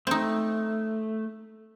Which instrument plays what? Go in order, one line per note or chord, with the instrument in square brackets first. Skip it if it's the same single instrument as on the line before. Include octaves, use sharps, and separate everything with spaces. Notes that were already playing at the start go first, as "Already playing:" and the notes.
[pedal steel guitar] A3 [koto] C4 D#4